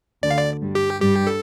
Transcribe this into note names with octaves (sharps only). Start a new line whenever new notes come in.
D2 D3 D5
F5
D5
G2 G3
G4
G2 G3 G4
A4